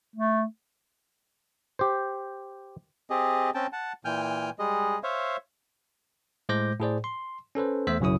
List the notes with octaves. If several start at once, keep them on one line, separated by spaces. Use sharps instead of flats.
A3
G4 C5
C4 G4 G#4 D#5
C4 C#4 G5 A5
F#5 A5
A#2 E3 G5 G#5 F6 G6
G3 G#3 G#4 D#5
C5 C#5 E5 F5
A2 G#3 C5 D6 G6 A#6
A2 G#4 C5 D5
C6
C#4 A4 B4 C5
E2 A3 C5 E6 B6
B1 F#2 C#3 F#3 E4 D#6